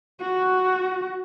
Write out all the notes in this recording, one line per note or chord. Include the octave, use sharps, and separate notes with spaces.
F#4